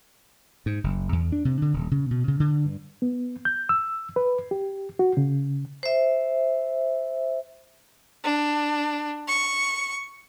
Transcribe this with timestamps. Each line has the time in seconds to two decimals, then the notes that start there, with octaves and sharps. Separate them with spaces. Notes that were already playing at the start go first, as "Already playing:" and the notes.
0.66 G#2
0.84 F#1
1.12 E2
1.32 D4
1.45 C3
1.62 D3
1.73 D#1
1.91 C#3
2.11 B2
2.28 C#3
2.40 D3
2.65 G2
3.02 B3
3.45 G6
3.69 E6
4.16 B4
4.51 G4
4.99 F#4
5.17 C#3
5.83 C5 E5
8.24 D4
9.28 C#6